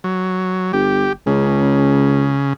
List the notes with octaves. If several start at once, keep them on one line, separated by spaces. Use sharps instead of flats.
F#3
G1 G4
C#2 C#3